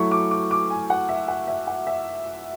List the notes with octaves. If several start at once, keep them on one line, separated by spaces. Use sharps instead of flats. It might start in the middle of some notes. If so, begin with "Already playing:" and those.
Already playing: F#3 A3 E4 C#6
D6
D6
D6
G#5
F#5
E5
F#5
E5
F#5
E5